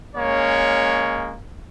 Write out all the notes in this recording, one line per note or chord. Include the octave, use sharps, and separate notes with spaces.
G#3 A#3 C#4 C#5